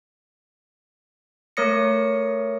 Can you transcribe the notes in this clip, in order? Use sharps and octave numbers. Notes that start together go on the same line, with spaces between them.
A3 A#4 C#5 D#6 A#6 C#7